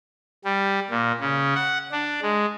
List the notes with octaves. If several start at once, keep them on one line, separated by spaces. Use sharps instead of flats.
G3
A#2
C#3
F#5
D4
G#3